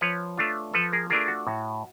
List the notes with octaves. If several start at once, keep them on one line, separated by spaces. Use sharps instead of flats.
F3 B4 C#5
A3 D4 F4
F3 A4 B4
G#4 A#4
A3 D4 F4 G#4 A#4
F#4
A2